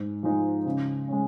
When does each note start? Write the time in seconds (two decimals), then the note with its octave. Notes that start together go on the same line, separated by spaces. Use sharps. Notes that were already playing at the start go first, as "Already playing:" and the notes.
Already playing: G#2
0.23 F3 G#3 D#4
0.66 C#3
1.08 G#3 C#4